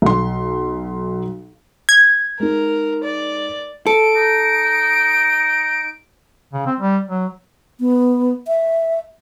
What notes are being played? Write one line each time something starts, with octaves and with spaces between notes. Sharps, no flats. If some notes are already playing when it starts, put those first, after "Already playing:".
B1 C6
G#6
G#3 D#4 A#4
D5
A4 D7
D#4
C#3
C4
G3
F#3
B3
E5